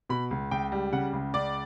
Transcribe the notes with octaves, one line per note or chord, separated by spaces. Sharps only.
B2 B5
C#2
C#2 G5
G3
C#3 F#5
C#2
C#2 D5